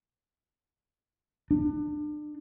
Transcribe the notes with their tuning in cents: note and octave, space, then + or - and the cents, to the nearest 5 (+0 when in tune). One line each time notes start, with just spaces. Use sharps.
D4 +30